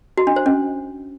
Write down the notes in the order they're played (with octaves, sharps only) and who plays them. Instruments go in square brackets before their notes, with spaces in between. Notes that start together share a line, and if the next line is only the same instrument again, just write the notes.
[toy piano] F#4
D4
C5
C#4